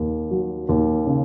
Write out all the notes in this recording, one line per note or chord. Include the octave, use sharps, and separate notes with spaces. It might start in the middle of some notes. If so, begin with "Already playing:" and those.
Already playing: D#2
F#3
D#2
C#3